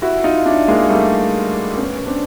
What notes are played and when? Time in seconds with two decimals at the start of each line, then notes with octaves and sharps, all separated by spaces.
0.02 E4 F#4
0.24 D#4 F4
0.46 D4 E4
0.68 G#3 A#3
0.89 G3 A3
1.77 B3 C#4
2.06 C4 D4